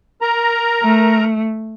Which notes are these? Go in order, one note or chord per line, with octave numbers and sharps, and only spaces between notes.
A#4 A#5
A3